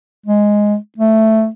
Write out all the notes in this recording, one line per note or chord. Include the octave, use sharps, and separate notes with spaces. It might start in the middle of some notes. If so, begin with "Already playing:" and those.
G#3
A3